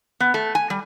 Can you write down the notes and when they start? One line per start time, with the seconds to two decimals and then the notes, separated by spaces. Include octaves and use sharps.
0.20 B3
0.34 A3
0.55 G#5
0.70 G3